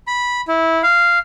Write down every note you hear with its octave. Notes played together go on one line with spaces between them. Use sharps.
B5
E4
F5